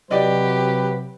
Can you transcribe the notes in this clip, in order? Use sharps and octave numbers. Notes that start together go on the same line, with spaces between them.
C3 F#3 G4 B4 D5 D#5